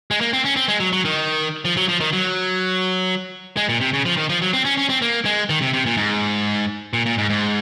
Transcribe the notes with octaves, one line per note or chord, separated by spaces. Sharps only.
G#3
A#3
C4
C#4
C4
G#3
F#3
F#3
D#3
F3
F#3
F3
D#3
F#3
G#3
A#2
C3
C#3
F3
D#3
F3
F#3
C4
C#4
C#4
C4
A#3
G#3
D#3
C3
C3
A#2
G#2
A#2
A#2
G#2
G#2